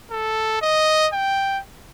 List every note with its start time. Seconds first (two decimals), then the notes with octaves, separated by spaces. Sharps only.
0.11 A4
0.62 D#5
1.13 G5